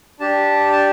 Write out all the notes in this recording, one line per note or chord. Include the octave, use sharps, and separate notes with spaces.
D4 G4 A5
A5